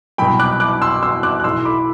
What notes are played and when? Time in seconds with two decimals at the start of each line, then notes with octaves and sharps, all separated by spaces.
0.18 C2 B2 F#3 G5 B5
0.39 D6 F#6
0.60 D6 F#6
0.82 C6 E6
1.03 C6 E6
1.23 D6 F#6
1.40 F#6
1.44 B1 A2 E3 C6 E6
1.65 B5 D6